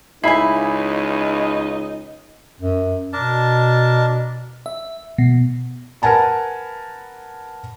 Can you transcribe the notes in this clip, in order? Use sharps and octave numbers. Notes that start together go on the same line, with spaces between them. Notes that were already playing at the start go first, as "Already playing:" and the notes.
C#2 D#4 E4 D#5 G#5 B5 C7
F#2
B2 D4 A#4 A5
E5
B2
A#4 B4 F#5 G#5 A5 B5